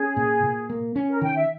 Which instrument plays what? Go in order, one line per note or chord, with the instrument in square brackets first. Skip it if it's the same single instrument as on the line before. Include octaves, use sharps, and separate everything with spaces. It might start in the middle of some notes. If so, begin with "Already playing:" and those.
Already playing: [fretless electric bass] C#4 [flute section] G#4
[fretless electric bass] A#2
A#2
A#3
C#4
[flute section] A#4
[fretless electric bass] D#3 [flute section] G5
[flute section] E5